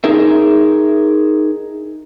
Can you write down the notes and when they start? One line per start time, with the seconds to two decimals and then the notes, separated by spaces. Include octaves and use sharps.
0.04 D#4 G#4 A#4 E5